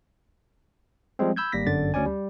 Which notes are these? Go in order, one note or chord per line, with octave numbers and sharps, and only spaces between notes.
F3 G3 G#3 C4
B5 E6 G6 G#6
G#1 G3 A#3 A#6 B6
G1 F#2 D3 D5 A6
D2 C#4 D5 G#5
G3